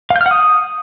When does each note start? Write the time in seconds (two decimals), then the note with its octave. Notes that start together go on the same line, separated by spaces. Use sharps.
0.10 F5
0.16 G6
0.21 F6
0.26 F#5
0.31 D#6